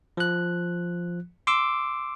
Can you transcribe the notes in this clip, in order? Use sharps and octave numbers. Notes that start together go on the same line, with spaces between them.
F3 F#6
C6 D6 E6